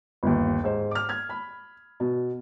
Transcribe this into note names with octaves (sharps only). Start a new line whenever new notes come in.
G1 D#2
G#2 C5
D6 F6
F6 G#6
B5
B2